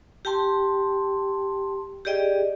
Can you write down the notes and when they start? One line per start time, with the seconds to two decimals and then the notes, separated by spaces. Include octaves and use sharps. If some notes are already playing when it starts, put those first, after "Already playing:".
0.25 G4 G5 A5 C6
2.05 G4 G#4 D5 D#5 G5